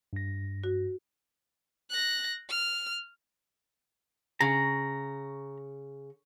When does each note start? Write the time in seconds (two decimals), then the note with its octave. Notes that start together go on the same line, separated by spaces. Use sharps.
0.13 G2 A#6
0.64 F#4
1.90 F#6 A#6
2.49 F6
4.41 C#3 A#5